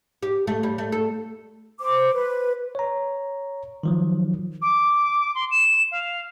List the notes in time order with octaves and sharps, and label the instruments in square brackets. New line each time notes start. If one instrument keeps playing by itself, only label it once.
[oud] G4
A3
G3
A3
A4
[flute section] C5 D6
B4
[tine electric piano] C#5 A#5
D#3 F3 F#3
[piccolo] D6
C6
E7
F5